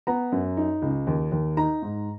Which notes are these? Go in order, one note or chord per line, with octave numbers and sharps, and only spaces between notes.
B3 A#5
F#2
D#4
C#2
D#2
D#2
D#4 A#5
G#2